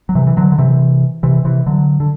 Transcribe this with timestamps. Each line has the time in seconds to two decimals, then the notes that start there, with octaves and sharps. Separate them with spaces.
0.09 F#3
0.15 C3 E3
0.27 E3
0.37 D3 F#3
0.52 D3
0.58 C3 E3
1.23 C3 E3
1.45 C3 E3
1.66 D3 F#3
2.00 D3